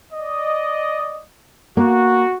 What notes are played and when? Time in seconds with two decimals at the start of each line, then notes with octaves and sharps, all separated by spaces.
0.13 D5 D#5
1.77 A#3 F#4